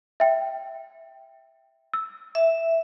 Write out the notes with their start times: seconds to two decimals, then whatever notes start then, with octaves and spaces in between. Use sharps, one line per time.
0.20 E5 G5
1.93 E6
2.35 E5